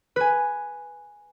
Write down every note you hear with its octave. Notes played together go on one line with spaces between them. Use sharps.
B4 G#5